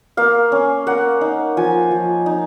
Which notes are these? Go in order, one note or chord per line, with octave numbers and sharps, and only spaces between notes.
A#3 F5
C#4
A#3 F#5
D#4
F3 G#5
F3
D#4